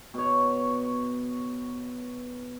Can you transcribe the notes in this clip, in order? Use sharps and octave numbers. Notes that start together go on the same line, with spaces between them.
B2 C#5